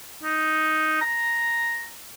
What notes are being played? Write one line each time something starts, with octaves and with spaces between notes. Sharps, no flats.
D#4
A#5